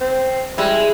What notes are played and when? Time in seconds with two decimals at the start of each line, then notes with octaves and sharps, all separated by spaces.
0.01 C4
0.58 G3 G#3 E4